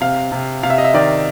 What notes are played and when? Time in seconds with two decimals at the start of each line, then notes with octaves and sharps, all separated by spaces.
0.01 C3 F5
0.32 C3
0.63 C3 F5
0.70 E5
0.78 D#5
0.84 E5
0.94 D#3 D5